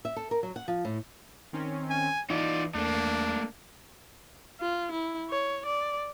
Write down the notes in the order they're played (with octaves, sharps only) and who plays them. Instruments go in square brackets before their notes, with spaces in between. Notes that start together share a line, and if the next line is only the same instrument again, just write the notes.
[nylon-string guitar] E5
A4
A#4
F#3
F#5
F3
A2
[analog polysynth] D#3 C4 C#4
[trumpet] G#5
[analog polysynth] E3 [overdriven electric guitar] D#4 F4 [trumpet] D5
[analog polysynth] E2 [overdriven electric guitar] A3 A#3 [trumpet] D4
[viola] F4
E4
C#5
D5